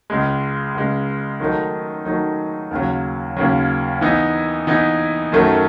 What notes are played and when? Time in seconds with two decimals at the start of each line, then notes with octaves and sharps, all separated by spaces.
0.10 C#2 C#3 G#3
0.74 C#2 C#3 G#3
1.40 D#3 F#3 A3 D#4
2.05 D#3 F#3 A3 D#4
2.71 D#2 C#3 F#3
3.37 D#2 C#3 F#3
4.01 E3 B3 D#4
4.67 E3 B3 D#4
5.32 F#2 D#3 F#3 A3